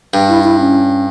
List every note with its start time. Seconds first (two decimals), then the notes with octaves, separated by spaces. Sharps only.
0.14 G2
0.29 E4
0.44 E4
0.60 C#4